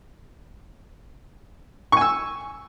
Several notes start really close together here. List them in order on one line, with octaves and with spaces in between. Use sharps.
C#6 G#5 E6